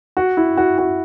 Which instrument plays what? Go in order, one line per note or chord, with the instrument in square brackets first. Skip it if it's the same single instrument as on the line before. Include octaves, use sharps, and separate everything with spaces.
[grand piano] F#4
E4
F#4
F#4